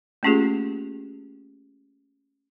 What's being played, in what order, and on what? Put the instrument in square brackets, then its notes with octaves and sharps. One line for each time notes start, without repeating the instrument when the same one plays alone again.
[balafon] A3 A#3 C#4 F4 G4 G#4